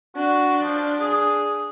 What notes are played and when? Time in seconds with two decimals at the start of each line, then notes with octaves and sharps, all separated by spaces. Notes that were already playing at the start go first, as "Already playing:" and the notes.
0.16 D4 F#4
0.63 F3
1.00 G#4